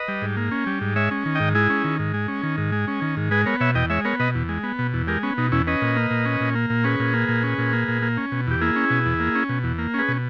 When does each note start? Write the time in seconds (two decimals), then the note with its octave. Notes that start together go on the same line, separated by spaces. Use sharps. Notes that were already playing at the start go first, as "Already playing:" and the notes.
Already playing: B4 D#5
0.08 G3
0.22 G#2
0.37 A#3
0.51 C#4
0.66 G3
0.81 G#2
0.96 G#3 C#5 E5
1.11 C#4
1.26 D#3
1.35 G#2 D#5 G5
1.55 G#3 E4 G#4
1.70 C#4
1.84 D#3
1.99 G#2
2.14 G#3
2.28 C#4
2.43 D#3
2.58 G#2
2.72 G#3
2.88 C#4
3.01 D#3
3.17 G#2
3.31 G#3 G#4 B4
3.46 B3 A#4 C#5
3.60 B2 C#5 E5
3.75 E2 D#5 G5
3.90 G#3 C#5 E5
4.05 B3 A#4 C#5
4.19 B2 B4 D#5
4.35 E2
4.49 G#3
4.63 B3
4.79 B2
4.94 E2
5.07 G#3 G4 A#4
5.23 B3 C#4
5.38 B2 D#4
5.52 E2 C#4 E4
5.67 C#4 B4 D#5
5.82 A#2
5.96 A#3
6.11 A#2
6.25 C#4
6.41 A#2
6.55 A#3
6.70 A#2
6.84 C#4 G#4 B4
7.00 A#2
7.14 A#3
7.28 A#2
7.43 C#4
7.58 A#2
7.73 A#3
7.88 A#2
8.02 A#3
8.17 C#4
8.32 B2
8.47 E2 G4
8.61 A#3 E4 G#4
8.76 C#4
8.90 B2
9.06 E2
9.20 A#3
9.35 C#4
9.49 B2
9.64 E2
9.79 A#3
9.94 C#4 G#4 B4
10.08 B2